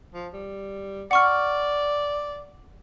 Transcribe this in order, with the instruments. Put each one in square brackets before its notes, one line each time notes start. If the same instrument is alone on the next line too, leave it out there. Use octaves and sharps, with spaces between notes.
[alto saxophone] F3
G3
[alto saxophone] D5 [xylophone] F#5 C#6 F6